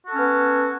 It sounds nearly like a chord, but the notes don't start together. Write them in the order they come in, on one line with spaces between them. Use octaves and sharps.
F#4 A4 C#4 B3